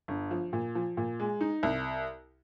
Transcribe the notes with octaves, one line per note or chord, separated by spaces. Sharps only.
G1
F3
A#2
F3
A#2
G#3
D#4
C2